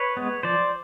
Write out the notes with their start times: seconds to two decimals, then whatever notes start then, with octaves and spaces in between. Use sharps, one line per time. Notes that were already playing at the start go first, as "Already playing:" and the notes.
Already playing: B4 C#5
0.17 G#3 B3
0.43 F3 C5 D5